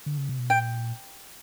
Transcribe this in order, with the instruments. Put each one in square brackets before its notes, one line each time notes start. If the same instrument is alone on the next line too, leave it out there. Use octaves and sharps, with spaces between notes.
[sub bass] D3
C#3
C3
B2
[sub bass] A#2 [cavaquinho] G5